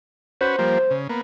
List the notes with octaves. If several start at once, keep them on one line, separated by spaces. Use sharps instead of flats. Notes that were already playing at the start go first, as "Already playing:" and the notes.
C#4 F#4 B4 C5
F3 G3 A#3
C#3
A#3 B3